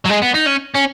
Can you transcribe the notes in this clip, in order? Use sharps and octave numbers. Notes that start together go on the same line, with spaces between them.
F#3
G#3
B3
D#4
C#4
C#4